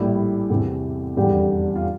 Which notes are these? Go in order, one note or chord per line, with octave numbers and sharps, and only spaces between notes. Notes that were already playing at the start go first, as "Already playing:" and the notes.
Already playing: A#1 A2 G3 E4
E2 C3 E3 A3
F1 E2 D3 G3 G4
F4